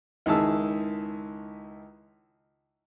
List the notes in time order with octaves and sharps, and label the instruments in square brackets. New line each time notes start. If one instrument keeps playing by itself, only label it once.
[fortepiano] C#2 D#3 E4 G#4 A5 E6